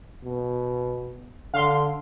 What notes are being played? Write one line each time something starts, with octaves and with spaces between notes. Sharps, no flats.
B2
D3 F5 C6